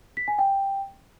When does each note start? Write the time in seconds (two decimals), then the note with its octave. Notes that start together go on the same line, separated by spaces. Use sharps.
0.17 B6
0.28 G#5
0.39 G5